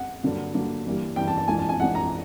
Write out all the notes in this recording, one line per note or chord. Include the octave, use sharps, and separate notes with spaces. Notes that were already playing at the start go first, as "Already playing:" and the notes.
Already playing: F#5
G2 D3 F#3 A#3
G2 D3 F#3 A#3
G2 E3 G3 A#3
G2 E3 G3 A#3 G5
A5
A5
A#1 G#2 E3 G#5
A5
G#5
A#1 G#2 E3 F#5
A#5